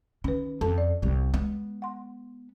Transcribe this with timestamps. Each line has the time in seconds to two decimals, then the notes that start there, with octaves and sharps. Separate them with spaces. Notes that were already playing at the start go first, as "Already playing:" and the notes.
0.24 D#3 C#4 B4
0.61 F2 A4 A5
0.78 D5
1.02 C2 G3
1.34 G#3 B3
1.82 F#5 C6